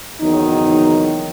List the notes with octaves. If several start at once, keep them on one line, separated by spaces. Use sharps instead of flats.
F#1 E2 D#3 F#3 D#4